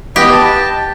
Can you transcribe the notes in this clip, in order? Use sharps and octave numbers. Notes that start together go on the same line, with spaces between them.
B3 G4 D#5
A5